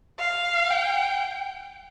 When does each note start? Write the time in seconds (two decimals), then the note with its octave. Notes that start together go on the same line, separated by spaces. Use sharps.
0.19 F5
0.70 G5